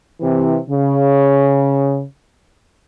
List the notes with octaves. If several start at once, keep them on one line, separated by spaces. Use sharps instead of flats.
C3 E3
C#3